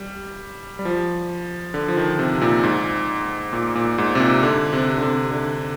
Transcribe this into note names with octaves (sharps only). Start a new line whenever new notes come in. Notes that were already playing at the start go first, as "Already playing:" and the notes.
Already playing: G3
G3
F3
D3
F3
D#3
C3
A#2
G#2
A#2
A#2
G#2
C3
A#2
D3
C3
D3
C3
D3